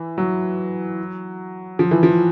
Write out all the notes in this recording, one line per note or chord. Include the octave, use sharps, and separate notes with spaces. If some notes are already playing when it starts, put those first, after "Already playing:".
Already playing: E3
F#3
F3
E3
F3